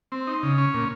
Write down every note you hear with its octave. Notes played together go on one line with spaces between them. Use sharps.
C4
D#4
C#3
C#4
A#2